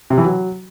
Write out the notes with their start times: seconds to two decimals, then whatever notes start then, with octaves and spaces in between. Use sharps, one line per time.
0.10 C3
0.18 E3
0.25 F#3